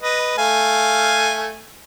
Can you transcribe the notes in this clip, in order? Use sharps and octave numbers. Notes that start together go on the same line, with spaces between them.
B4 D#5
A3 F5 G#5